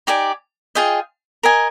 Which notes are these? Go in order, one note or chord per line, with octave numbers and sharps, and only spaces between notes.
D#4 G4 D5 G#5
F4 G#4 D#5 G5
A#4 D#5 G#5